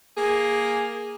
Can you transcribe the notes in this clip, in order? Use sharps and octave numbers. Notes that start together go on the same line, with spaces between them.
A#3 G#4